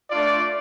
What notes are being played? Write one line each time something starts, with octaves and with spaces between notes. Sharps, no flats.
A3 D4 F4 D5